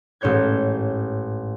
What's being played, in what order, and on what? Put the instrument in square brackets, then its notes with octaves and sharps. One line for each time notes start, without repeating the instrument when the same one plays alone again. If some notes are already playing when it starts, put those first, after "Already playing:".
[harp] A1 G#2 C#5 G6 G#6